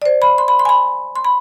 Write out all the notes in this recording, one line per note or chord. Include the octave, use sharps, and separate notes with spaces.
D5
C5
B5
C6
B5
C6
G#5
B5
C6
B5